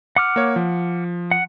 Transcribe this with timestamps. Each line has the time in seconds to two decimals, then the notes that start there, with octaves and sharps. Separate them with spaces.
0.16 F#5 D6 F6
0.36 A#3 C#5
0.56 F3
1.31 F#5